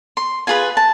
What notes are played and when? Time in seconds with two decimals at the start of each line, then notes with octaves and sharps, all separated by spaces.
0.17 C6
0.47 F4 G#4 B4 G#5
0.77 A5